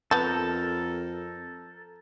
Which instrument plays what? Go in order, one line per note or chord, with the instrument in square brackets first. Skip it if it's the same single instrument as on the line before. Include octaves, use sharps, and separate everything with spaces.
[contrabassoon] F2 [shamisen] B3 A5 [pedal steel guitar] A4 A#4 [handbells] G6 A6